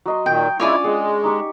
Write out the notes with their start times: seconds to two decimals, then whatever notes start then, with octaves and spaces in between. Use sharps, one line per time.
0.06 F#3 D#5 C6
0.26 A#2 D#3 G5
0.60 G#3 C#4 D4 E4 F4 C#5 D5 G#5
0.84 G#3 G#4 F#5 G5
1.23 D#4 G4 C#6